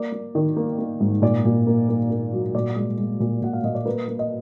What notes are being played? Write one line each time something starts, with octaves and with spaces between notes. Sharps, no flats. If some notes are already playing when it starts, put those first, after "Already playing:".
Already playing: A#3 D5
A#3
D#3
A#3
A#3
G#2
A#2 D5
A#2
A#3
A#3
A#3
F#3
A#2 D5
G#3
G#3
A#2
A#2 F#5
F5
A#2 D#5
D5
A#3 B4
A#3
D#5